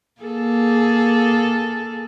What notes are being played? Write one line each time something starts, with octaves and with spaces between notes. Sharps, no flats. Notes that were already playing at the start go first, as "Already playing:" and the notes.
A#3 G#4 A4